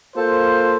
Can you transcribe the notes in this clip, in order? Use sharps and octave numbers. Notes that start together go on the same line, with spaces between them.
A#3 F4 A4 C5